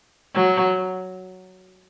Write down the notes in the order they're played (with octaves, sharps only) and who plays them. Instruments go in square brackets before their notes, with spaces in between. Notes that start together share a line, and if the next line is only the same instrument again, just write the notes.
[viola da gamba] F#3